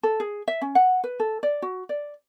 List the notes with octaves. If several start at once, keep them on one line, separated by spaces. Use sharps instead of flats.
A4
G#4
E5
C#4
F#5
B4
A4
D5
F#4
D5